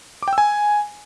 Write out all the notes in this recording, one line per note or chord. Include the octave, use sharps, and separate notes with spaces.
D6
G5
E6
G#5